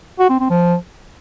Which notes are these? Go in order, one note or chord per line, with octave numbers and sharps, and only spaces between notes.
F#4
C4
C4
F3